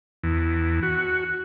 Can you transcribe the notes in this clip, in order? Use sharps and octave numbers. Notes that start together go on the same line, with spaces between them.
E2
F#4